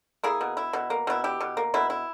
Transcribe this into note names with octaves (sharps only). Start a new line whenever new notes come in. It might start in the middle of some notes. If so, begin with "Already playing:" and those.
A#3 E4 G#4
B2
E4
B2
A#3
B2 E4
E4 G4
B2
A#3
B2 E4
E4